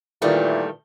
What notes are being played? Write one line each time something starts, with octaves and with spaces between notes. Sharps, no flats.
A#2 D#3 E3 G3 A3